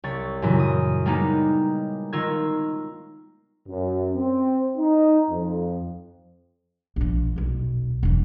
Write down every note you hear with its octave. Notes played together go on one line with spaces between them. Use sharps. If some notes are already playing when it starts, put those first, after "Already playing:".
C2 C#5 A6
F#2 A#2 C#3 E3
D#6
G3 G#3 A#3 B3 D#4 G4
D#3 F4 A#4 E6 G#6
F#2
C4
D#4
F2
A#1 F3
D#1 B1
E1 E3